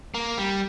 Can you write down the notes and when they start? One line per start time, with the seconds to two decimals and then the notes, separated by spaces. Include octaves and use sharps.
0.14 A#3
0.38 G3